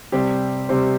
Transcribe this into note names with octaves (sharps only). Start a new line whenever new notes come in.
C3 G3 C4 G4 C5
C3 G3 C4 G4 C5